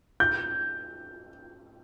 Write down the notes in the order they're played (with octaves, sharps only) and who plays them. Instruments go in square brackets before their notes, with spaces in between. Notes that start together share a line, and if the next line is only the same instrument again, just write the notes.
[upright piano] G6